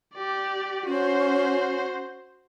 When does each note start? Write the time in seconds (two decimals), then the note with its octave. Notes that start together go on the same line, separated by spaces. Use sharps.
0.15 G4 D5
0.86 C#4 F#4 C5